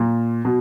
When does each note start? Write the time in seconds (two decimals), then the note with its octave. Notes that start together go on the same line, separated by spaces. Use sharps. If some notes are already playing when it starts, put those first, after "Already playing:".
Already playing: A#2
0.45 B2